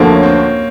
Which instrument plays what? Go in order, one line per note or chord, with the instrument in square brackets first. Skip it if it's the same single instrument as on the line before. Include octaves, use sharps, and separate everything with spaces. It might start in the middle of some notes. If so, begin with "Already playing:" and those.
Already playing: [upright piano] D2 D3 F3 A3 [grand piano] A#3
[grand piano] C#4
C4